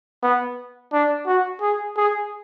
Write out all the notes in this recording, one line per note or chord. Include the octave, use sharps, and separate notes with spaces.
B3
D4
F#4
G#4
G#4